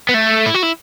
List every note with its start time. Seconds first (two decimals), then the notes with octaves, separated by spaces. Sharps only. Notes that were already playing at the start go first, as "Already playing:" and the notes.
0.09 B3
0.14 A3
0.46 E4
0.54 F#4
0.63 E4